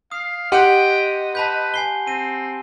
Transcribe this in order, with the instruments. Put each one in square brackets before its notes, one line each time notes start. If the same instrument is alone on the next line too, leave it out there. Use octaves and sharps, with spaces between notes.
[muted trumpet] F5 [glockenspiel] D#6 C7
[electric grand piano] G4 F#5 [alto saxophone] D#5 [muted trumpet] G5 [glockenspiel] C6 F#6 D#7
[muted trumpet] B4 [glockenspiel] A5 B5 G6
[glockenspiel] G#5 C7 G7
[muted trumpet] C4 [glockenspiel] D#7